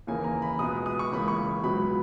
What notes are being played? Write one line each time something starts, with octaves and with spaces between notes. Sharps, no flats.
D#2 C#3 E3 A#3 G#5
A#5
B5
C#2 B2 G#3 B3 D#6
D#6
C#6
C#2 C#3 E3 A#3 B5
C#6
C#2 B2 F#3 B3 B5